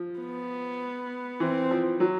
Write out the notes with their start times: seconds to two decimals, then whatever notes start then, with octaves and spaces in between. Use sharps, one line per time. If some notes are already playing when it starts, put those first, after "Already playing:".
Already playing: F3
0.20 B3
1.40 E3 C4
1.71 F3
2.00 F#3